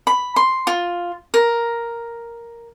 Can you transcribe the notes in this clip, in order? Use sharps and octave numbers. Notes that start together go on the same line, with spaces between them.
B5
C6
F4
A#4